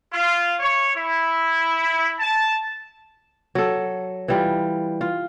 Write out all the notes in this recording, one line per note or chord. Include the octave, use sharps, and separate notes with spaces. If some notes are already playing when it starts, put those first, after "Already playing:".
F4
C#5
E4
A5
F#3 A4
E3 G3 F4
F4